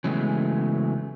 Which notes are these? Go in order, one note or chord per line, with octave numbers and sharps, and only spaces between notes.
C#3 E3 F#3 G#3 A3 B3